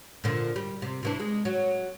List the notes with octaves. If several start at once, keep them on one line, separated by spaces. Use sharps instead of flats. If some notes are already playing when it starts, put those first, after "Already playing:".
A#2 D3 F3
G3
C3
C3 E3 D4
G#3
F#3